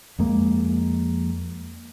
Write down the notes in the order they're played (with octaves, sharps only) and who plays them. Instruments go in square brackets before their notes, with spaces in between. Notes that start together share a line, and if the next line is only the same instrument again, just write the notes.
[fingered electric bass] F2 G#3 A#3